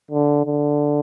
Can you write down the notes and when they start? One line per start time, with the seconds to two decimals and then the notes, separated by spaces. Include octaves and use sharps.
0.11 D3
0.46 D3